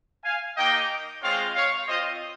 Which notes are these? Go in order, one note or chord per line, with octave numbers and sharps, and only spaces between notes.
F5 G#5
A#3 D#4 G4 D#5 G5
G#3 C4 F4 C#5 F5
C#5 F5
C4 F4 C5 D#5